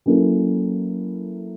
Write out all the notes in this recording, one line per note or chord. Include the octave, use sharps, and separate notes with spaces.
F#3 A#3 C#4 E4 A4